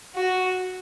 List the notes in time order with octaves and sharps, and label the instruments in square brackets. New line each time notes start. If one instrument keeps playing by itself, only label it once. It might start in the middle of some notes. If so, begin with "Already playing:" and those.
[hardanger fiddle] F#4